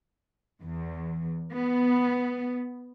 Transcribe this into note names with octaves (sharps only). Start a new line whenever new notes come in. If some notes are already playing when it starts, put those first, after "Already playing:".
E2
B3